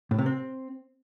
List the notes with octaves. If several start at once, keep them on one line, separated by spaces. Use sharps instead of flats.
A2
C3
C4